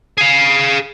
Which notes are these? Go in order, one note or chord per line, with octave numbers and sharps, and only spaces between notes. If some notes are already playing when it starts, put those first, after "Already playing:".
G#4 F5